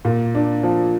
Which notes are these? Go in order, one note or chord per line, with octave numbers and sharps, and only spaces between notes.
A#2
D4
F3